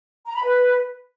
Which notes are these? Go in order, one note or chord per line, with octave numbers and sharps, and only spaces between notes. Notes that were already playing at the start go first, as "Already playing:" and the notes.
A#5
B5
B4